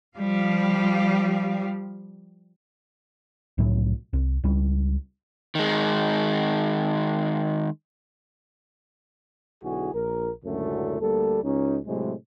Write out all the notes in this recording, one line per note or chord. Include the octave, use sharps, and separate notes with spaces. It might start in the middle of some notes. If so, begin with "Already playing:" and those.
F3 G3 F5
C2 A2 F#3
C2
C#2 G3
D#3 G#3
B1 D3 E4 F#4 G#4
A#1 A#4
C#2 F#2 A2 D3 F#3 A3
D2 G3 A#3 A4
C#2 C#4 D#4
A2 C3 F#3 G#3